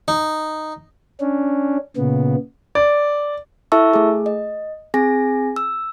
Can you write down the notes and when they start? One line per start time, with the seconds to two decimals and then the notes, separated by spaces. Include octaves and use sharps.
0.08 D#4
1.20 C#4 D4
1.97 A#2 C#3 B3
2.75 D5
3.72 E4 A4 E5 A5 C#6 E6
3.93 A3 G#4
4.26 D#5
4.94 C4 G#4 G#5 A#6
5.56 E6